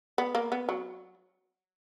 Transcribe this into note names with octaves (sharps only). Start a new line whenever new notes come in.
B3
A#3
B3
F#3